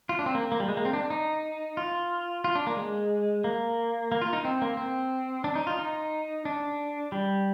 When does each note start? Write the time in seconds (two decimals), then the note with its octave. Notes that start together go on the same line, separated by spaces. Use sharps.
0.09 F4
0.19 D4
0.26 C4
0.35 A#3
0.52 A#3
0.60 G3
0.68 G#3
0.77 A#3
0.85 C4
0.93 D4
1.10 D#4
1.77 F4
2.44 F4
2.55 D4
2.67 A#3
2.77 G#3
3.44 A#3
4.12 A#3
4.22 F4
4.33 D#4
4.45 C4
4.62 A#3
4.77 C4
5.44 D4
5.55 D#4
5.67 F4
5.79 D#4
6.45 D4
7.12 G3